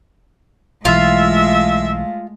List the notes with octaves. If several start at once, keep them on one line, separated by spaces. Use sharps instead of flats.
B1 E3 G#3 A3 F4 E5